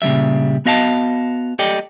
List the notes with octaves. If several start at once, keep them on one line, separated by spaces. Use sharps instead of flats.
A#2 C#3 F#3 G3 E5
B3 F#4 D#5 F5 G5 A5
G4 A4 D5 D#5 G5